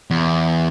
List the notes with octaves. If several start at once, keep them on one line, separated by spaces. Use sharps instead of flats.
E2